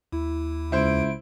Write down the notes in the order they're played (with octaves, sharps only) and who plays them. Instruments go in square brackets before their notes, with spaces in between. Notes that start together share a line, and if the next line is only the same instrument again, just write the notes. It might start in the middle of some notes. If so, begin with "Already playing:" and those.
[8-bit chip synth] D#2 [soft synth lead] E4
[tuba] C#2 [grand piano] E4 C5 [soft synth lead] D7